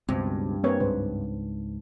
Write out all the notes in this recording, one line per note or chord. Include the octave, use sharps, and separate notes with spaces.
C#2 G2 B2 C4
A#3 C4 B4 C#5
C#2 G#2 C#3 B4 C5